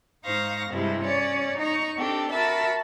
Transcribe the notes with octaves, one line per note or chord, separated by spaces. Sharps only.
G#2 D#4 C5 F5 C#6 A#6
G2 C3 G3 G#3 E4
C#4 C#5 D5
D#4 A#5 C#6
C4 D4 G4 A4
F#4 A#4 E5 A5 B5